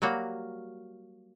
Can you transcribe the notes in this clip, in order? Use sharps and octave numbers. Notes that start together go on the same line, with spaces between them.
F#3 G3 A#3 F#4